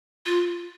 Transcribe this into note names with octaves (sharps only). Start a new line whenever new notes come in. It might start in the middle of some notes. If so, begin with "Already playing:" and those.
F4